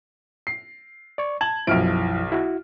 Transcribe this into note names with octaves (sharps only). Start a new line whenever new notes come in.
C7
D5 C#6
A5 G#6 F#7
B1 F#2 F3 E4 F6 D7
E4 F#4